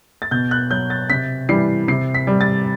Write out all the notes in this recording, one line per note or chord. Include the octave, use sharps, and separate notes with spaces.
A6
B2 G6
F#6
F#3 G6
A6
C3 B6
E3 G3 C7
C3 C7
B6
G3
A6